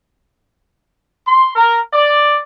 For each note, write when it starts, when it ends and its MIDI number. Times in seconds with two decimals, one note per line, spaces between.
1.26 1.51 84
1.55 1.79 70
1.93 2.41 74